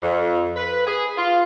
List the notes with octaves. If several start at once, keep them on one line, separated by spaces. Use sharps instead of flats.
F2
B4
G#4
F4